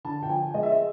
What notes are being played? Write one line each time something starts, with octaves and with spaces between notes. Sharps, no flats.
D3 A5
G5
F3 G#5
G#3 D#5
E5
D#5